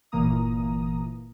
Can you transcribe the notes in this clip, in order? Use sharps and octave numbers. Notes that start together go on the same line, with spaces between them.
G1 A#2 E3 A#3 A#5 D#6